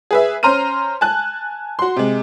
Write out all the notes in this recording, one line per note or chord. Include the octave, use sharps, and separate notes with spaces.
G#4 B4 E5
C#4 C5 A#5 C6 F6 D#7
G#5 A5 F#6
F#4 C6
C3 G#3